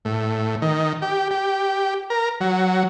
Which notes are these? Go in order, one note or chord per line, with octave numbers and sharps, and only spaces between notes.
A2
D#3
G4
G4
A#4
F#3